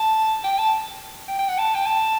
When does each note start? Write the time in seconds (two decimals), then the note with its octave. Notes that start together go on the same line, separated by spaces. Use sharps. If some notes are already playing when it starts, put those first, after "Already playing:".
Already playing: A5
0.44 G5
0.58 A5
1.28 G5
1.39 G5
1.49 F#5
1.58 A5
1.75 G5
1.86 A5